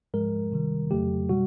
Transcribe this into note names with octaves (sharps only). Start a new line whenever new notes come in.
G#2 F3 G#3 A#4
C3 D#3 G3
F2 C#3 F#3 A3 G4
B2 G3 F#4